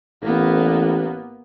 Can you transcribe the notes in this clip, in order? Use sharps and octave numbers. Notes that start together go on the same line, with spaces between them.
A1 A#3 B3